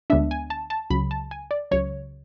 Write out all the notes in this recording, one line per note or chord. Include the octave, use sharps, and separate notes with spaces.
D2 D3 G#3 B3 D4 E5
G#5
A5
A5
C#2 C#3 F#3 B5
A5
G#5
D5
C#2 C#3 F#3 C#5